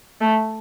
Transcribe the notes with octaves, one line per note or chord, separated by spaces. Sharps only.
A3